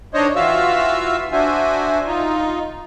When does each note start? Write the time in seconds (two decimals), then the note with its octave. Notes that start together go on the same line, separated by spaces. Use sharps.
0.14 D#3 D4 C5 C#5 D#5
0.36 E3 F4 F#4 E5 F5 E6
1.32 D4 F#4 C5 E5 G#5
2.06 D#4 F4